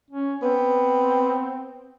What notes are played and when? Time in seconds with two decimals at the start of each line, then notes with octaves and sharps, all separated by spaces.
0.11 C#4
0.42 B3 C4